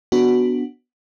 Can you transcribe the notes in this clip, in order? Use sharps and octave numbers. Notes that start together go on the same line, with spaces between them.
B3 D4 F#4